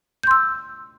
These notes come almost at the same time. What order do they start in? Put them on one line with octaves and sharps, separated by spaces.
G6 C6 E6